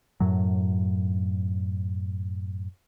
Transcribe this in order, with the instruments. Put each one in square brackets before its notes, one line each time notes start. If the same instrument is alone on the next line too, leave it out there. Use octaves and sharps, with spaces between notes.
[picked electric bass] F#2 A2 F#3